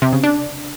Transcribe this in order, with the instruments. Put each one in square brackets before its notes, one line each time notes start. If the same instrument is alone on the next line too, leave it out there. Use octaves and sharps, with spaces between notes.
[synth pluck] C3
C#3
D4